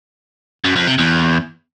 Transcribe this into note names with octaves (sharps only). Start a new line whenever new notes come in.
F#2
F2
C3
E2